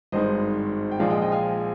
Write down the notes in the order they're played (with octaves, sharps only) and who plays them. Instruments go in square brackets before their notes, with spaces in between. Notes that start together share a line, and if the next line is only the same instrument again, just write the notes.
[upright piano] G#1 G2 D#3 G#3 C5 D#5
G5
A#1 A#2 F3 G#3 D5 F5
D#5 G5
D#5 G5
F5 G#5